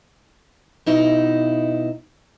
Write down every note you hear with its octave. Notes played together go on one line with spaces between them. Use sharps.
B2 D#4 E4